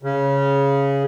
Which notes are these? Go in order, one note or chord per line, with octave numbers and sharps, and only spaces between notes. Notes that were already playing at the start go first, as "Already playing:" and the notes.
C#3